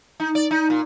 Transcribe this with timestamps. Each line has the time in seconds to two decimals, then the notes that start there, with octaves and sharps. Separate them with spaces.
0.20 D#4
0.35 D5
0.51 D#4
0.70 A#2